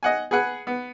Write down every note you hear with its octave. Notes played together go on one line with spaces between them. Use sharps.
D#5 F#5 G#5
G#4 B4 F#5 G#5
B3